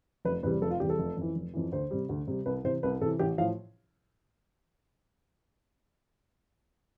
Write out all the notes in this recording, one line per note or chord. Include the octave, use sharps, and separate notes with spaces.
F1 B4
E2 C3 G3 B4
F1 A4
F4
E2 C3 G3 G4
A4
F1
F2 E3
F1
F2 E3
D2 C5
C3 G3
D2
C3 G3
C2 B4
C3 E3 C5
C2 B4
C3 E3 A4
A1 G4
A2 F3 F5